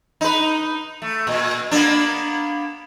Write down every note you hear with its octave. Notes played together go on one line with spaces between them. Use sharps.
D#4 B4
A3
A#2
A#3 B3 D4